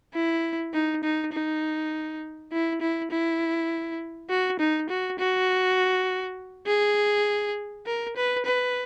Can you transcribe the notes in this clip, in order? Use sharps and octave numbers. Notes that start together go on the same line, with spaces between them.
E4
D#4
D#4
D#4
E4
E4
E4
F#4
D#4
F#4
F#4
G#4
A#4
B4
B4